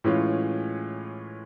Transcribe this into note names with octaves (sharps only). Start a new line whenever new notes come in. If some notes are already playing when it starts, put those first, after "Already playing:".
A2 E3 G#3 C#4 F4